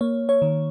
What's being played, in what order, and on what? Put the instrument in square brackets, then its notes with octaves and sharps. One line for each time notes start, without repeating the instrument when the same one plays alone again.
[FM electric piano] A#3 C#5
C#5
D#3